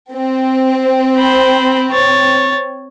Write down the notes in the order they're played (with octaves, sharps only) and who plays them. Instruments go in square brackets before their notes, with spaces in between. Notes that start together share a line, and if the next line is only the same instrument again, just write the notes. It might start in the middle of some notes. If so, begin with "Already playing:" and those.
[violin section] C4
[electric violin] C5 B5
C#5 A6